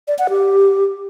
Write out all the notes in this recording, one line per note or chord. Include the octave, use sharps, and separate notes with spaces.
D5
F#5
G4